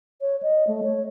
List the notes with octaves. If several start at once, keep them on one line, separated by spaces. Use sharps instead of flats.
C#5
D#5
A3
C#5